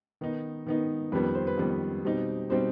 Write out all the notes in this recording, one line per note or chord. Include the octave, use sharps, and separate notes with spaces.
D#3 B3 D#4
D#3 B3 D#4
F2 D#3 G3 B3 B4
B4
C5
B4
F2 D#3 G3 B3
B2 G3 C4 D#4
B2 G3 C4 D#4 C5